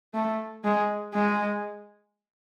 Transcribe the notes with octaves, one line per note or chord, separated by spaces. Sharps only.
A3
G#3
G#3